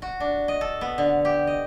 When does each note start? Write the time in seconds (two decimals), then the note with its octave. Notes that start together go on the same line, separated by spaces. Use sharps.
0.02 F#4
0.20 D4
0.48 D#5
0.61 A4
0.81 B3
0.98 D3
1.25 G4
1.47 D#5